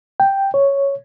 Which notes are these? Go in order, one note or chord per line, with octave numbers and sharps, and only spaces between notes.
G5
C#5